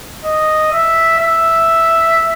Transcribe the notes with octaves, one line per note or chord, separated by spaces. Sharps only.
D#5
E5
E5